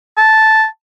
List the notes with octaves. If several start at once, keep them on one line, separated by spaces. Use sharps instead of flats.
A5